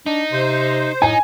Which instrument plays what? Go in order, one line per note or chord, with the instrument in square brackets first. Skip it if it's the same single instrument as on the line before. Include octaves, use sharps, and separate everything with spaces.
[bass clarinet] D4 [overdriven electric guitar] D#4
[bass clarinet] C3 [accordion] C5
[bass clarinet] A2 [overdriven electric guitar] D#4 [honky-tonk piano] G#5